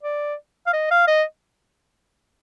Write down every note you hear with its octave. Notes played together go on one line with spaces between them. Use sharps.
D5
F5
D#5
F5
D#5